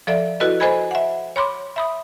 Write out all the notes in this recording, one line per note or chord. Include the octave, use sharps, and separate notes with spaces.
F3 A4 D5 E5
E4 F#4 A4 B4 D#5
A4 C5 D#5 G#5 B5 G#6
E5 F#5
C#5 B5 C6 D6
E5 B5 D#6